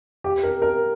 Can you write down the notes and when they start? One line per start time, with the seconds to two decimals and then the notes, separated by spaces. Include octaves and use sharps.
0.24 G4
0.43 A#4
0.62 A#4